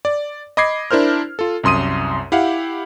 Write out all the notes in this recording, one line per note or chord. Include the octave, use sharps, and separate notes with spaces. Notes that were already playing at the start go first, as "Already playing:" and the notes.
D5
D#5 B5 D6 G#6 C7
D4 E4 A#4 C5 F6
F4 A4
C2 F#2 C6 D#6 D#7
E4 G4 F5 F#5